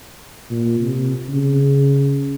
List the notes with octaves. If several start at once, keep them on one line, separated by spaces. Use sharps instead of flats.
A#2
C3
C#3